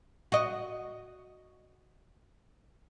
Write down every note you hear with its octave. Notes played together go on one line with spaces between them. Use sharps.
F#4 D#5